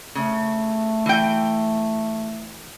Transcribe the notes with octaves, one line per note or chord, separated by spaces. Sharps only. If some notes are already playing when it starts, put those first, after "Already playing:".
C#3 A3
E3 G5